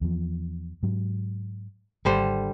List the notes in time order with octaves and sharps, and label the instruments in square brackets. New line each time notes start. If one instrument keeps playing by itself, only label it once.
[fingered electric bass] E2 F3
G#2 F#3
[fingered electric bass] G#1 [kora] D3 G3 C5